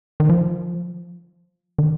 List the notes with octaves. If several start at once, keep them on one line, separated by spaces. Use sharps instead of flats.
D#3
F3
D#3